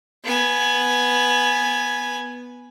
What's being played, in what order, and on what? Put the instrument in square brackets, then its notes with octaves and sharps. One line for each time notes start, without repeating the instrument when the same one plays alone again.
[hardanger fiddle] B3 G#5